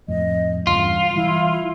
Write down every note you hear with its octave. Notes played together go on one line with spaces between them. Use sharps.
F2 A2 D#5
E2 G2 C#3 F4 C6
E3 G3 E4